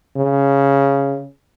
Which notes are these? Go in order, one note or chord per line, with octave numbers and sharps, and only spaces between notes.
C#3